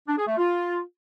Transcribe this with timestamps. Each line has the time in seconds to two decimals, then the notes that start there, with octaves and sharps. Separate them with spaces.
0.08 D4
0.18 G#4
0.27 A3
0.37 F4